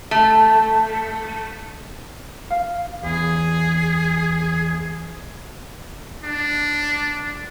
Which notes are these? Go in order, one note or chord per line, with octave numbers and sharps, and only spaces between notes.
A3
F5
E2 G#4
D4